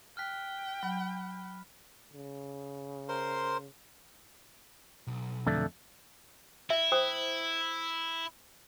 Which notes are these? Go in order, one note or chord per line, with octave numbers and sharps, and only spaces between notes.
G5 F6 F#6 B6
F#3 B5
C#3
A#4 C5 C6
B1
F2 D3 A3
E4 E5
C5 G5 D#6